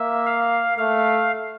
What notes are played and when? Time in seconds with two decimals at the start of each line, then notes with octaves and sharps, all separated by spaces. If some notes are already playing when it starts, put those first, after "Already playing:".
Already playing: A#3 E5
0.26 F5
0.78 A3 F5